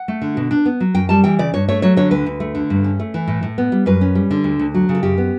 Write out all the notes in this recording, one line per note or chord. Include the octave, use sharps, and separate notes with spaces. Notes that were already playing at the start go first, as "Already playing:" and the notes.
Already playing: F#5
A3
D3
B2
D4
B3
F#3
F#2 G5
G3 A5
E3 G5
C#3 D5
G2 C#5
A3 C#5
F#3 C#5
D3 C#5
D2 B4
D2
A3
D3
G2
C#4
A3
E3
A2
A2
B3
G3
F#2 B4
C#4
G3
D3
D2
D2
F#3
C#3
A4
F#2 G4
B3